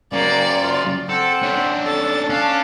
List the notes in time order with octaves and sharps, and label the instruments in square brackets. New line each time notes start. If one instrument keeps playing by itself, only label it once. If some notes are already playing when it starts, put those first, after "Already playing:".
[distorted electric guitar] C#3 F#3 [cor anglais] A#3 [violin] D5
[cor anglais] F4
[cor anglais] C4 [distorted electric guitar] A4 [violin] F#5
[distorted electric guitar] C#4 D4
[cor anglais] A4 [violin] A6
[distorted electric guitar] C#4 [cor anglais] D4 [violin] F5 A5